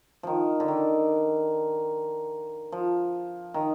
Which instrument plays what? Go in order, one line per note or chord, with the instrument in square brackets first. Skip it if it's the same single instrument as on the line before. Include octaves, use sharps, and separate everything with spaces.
[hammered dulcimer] D#3 F3
D3
D#3
F3
D#3